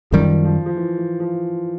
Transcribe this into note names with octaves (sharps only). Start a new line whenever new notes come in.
F#2 D#3 F3 G3
F3
F3
E3
E3
F3